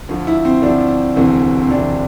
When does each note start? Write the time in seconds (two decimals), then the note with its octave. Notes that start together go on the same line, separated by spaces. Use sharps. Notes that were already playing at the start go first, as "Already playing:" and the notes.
0.09 D2 D3 F3
0.27 E4
0.45 C4
0.62 D2 D3 F3 D4
1.16 E1 D2 C3 E3 C4
1.61 C4
1.70 E1 D2 C3 E3 D4